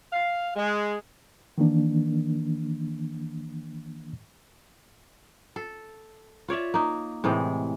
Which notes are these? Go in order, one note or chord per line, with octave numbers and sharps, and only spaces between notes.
F5
G#3
D#3 E3 A#3 D4
A4
F4 C#5 D5 E5
A#3 D#4
A2 C3 E3 G#3